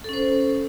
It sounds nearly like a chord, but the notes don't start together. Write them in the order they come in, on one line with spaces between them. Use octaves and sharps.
A4 C#4 C5